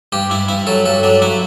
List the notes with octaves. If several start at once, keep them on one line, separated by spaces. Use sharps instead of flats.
G2 G4
G2 E4
G2 E4
F#3 A4
G2 A4
F#3 D4
F#3 E4